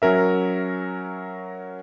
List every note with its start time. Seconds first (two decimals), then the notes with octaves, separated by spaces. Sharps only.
0.02 F#3 C#4 A#4 E5